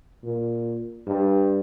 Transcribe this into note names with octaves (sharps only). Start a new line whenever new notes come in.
A#2
G2